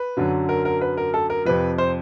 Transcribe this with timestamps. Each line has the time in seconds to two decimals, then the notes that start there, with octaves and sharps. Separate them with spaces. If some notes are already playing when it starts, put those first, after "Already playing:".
Already playing: B4
0.17 F#2 D3 F#3
0.49 A#4
0.65 A#4
0.81 B4
0.97 A#4
1.14 A4
1.30 A#4
1.45 F2 C3 F3 B4
1.78 C5